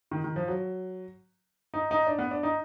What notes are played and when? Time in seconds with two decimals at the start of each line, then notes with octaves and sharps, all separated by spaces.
0.11 D#3
0.24 D#3
0.36 F3
0.48 F#3
1.74 D#4
1.91 D#4
2.07 D4
2.19 B3
2.31 D4
2.43 D#4